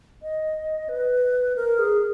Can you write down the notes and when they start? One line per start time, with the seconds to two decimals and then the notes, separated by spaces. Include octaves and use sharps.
0.22 D#5
0.89 B4
1.56 A#4
1.79 G#4